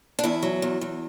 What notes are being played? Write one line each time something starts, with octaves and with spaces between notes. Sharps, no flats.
D4
E2 E4
F#3
E2
E2